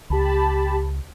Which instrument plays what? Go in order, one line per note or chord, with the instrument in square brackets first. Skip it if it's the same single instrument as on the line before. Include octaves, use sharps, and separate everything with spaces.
[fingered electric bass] C#2 [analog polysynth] G4 A5 B5